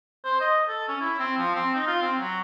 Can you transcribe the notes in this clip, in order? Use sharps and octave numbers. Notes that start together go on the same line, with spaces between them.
C5
D#5
A4
C#4
E4
C4
F3
C4
D#4
F4
C4
F#3